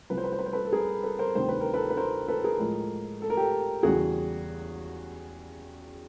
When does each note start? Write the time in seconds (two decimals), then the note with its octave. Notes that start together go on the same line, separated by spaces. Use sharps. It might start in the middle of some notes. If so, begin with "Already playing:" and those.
0.10 C2 C3 F3 B4
0.18 C5
0.24 B4
0.32 C5
0.39 B4
0.46 C5
0.53 A4 B4
0.65 A4
0.72 G#4 A#4
1.03 A4 B4
1.19 A#4 C5
1.35 D2 C3 D#3 G3 C5
1.49 B4
1.61 A#4
1.74 A4 B4
1.90 B4
1.97 A#4 C5
2.28 A4 B4
2.44 G#4 A#4
2.59 A2 F3 G#3
3.22 A4
3.30 A#4
3.37 G4 A4
3.83 E2 C#3 E3 G3 F#4 G#4